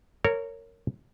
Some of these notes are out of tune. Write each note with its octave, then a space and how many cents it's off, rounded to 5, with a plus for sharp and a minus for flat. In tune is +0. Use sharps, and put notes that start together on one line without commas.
A#4 -20 C#5 +0